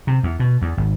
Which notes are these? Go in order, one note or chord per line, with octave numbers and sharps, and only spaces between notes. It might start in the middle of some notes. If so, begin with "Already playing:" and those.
C3
E2
B2
E2
G#1